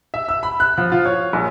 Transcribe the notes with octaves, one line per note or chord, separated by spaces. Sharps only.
E5
E6
B5
F#6
F3
F4
C#5
A#1